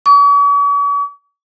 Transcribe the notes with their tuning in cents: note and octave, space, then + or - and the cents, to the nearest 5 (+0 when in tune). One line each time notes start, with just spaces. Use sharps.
C#6 +45